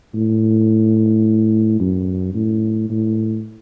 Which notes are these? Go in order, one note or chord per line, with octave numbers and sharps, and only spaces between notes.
A2
F#2
A2
A2